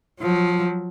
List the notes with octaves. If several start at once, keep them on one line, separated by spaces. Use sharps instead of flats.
F3 F#3